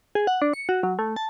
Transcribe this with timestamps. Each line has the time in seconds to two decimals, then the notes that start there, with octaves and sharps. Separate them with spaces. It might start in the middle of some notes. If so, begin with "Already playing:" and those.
0.15 G#4
0.27 F#5
0.42 D4
0.54 C#7
0.69 F#4
0.83 F#3
0.99 A3
1.16 A5